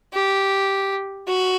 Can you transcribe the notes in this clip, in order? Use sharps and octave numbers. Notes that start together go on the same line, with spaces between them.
G4
F#4